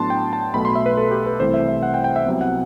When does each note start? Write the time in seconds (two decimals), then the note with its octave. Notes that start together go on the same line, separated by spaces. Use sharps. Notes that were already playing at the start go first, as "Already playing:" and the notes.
Already playing: A2 F#3 B3 D4 A5 C6
0.10 G5
0.33 A5
0.54 B1 B2 A3 B5
0.65 C6
0.76 E5
0.86 B4
0.97 A4
1.11 G4
1.26 B4
1.39 C2 C3 E3 A3 C5
1.54 E5
1.68 E5
1.83 F#5
1.94 G5
2.04 G5
2.16 E5
2.26 C2 C3 F#3 B3
2.41 F#5